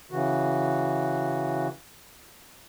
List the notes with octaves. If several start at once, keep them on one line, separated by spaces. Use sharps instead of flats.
C#3 E3 F#4